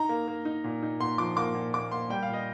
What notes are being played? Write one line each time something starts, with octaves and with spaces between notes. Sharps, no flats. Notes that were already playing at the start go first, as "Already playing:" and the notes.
Already playing: D#4 A#5
A#3
A#3
D#4
A#2
D#4
A#2 C6
F3 D6
A#3 D6
A#2
A#3 D6
A#3 C6
G3 G5
F5
A#2 D#5